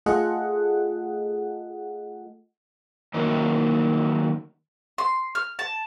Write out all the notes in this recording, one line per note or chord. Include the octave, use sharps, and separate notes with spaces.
A3 F4 G#4 A4 D#5 F#5
D#3 F#3 A3 A#3
C6
F6
A5